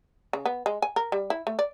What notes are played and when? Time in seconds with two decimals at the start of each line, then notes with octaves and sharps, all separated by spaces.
0.33 C#3
0.45 B3
0.66 G#3
0.82 G#5
0.96 A#4
1.12 G3
1.30 E4
1.47 A3
1.59 D5